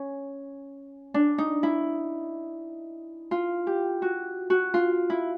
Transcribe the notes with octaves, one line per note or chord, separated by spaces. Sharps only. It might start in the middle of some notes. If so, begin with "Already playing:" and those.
Already playing: C#4
D4
D#4
E4
F4
G4
F#4
F#4
F4
E4